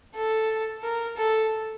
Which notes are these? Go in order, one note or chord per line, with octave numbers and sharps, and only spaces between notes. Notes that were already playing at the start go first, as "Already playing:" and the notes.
A4
A#4
A4